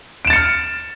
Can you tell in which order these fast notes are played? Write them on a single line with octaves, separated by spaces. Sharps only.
D7 E7 A6 C#7 F6